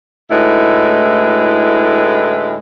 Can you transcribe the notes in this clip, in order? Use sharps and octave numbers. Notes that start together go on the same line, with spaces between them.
D2 A2 G#3 D#4 E4 B4